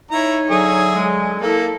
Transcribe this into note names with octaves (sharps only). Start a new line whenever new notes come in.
D#4 E4 C#5 A#5
D3 F#3 G#4 E5 D#6
G#3
A#3 E4 A4